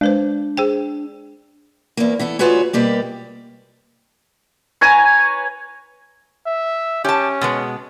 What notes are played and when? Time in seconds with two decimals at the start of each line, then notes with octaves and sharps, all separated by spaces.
0.01 G#3 D4 B4 C5
0.57 G#4 C5 G5
1.97 E2 A#3
2.19 E3 B3 A4
2.39 D2 F4 F#4 G#4 B4 C#5
2.73 B2 G3 A#3 G4
4.81 B4 C#5 G#5 A#5
6.47 E5
7.04 C#4 G4 A5
7.41 B2 G#3 B3